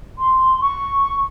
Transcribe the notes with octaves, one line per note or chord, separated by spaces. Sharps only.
C6
C#6